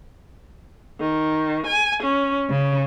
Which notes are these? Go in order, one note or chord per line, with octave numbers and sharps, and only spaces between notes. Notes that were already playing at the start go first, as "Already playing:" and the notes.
D#3
G#5
C#4
C#3